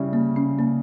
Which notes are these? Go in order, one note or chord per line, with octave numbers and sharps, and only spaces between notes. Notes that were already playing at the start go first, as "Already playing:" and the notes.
Already playing: C#3 G3 C#4 E4
A#3
C#4
A#3